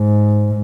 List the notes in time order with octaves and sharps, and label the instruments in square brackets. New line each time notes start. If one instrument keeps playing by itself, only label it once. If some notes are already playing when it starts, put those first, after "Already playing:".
Already playing: [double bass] G#2